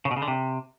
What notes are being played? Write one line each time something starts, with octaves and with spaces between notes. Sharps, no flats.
C#3
B2
C#3
D3
C3